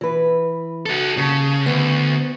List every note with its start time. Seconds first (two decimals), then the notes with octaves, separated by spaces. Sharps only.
0.01 E3 B4
0.86 F#4 A4
1.17 D#2 C#3 A5
1.66 D2 B3